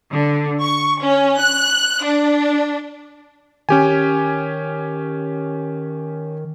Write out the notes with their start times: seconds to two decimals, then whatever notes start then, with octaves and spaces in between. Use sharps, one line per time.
0.11 D3
0.61 C#6
1.02 C#4
1.40 F#6
2.03 D4
3.69 D#3 C#4 G4 G#5